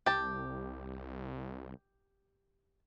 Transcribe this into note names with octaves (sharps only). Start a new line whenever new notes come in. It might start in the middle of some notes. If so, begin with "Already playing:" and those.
C2 G4 A5